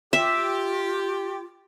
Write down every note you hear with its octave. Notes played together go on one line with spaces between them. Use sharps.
F4 G4 E5